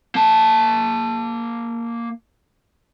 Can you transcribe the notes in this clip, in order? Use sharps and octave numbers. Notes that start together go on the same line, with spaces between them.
A#3 A5